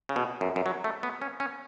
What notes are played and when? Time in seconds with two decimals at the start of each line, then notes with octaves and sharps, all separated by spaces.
0.09 C#3
0.16 B2
0.41 F#2
0.56 F#2
0.66 F#3
0.84 A3
1.03 B3
1.22 C#4
1.40 C#4